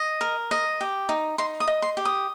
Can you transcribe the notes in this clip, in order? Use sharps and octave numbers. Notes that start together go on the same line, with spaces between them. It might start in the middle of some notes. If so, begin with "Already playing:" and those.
Already playing: D#5
A#4
D#5
G4
D#4
D#4 C6
D#6
D#5
C6
G4
D#6